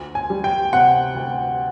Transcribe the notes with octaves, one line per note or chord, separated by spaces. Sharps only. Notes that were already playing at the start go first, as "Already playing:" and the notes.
Already playing: D2
G#5
G3
G5
C3 F#5
D2